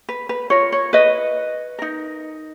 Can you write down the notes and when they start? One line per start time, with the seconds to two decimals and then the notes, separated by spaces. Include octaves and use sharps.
0.09 B4
0.29 B4
0.50 F4 A#4 C#5
0.72 C#5
0.93 B4 D#5
1.79 D#4 A#4